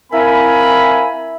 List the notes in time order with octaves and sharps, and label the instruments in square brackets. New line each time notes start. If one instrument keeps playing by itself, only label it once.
[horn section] C4 B5 [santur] E4 [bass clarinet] A#4 [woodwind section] E5 F5 G#5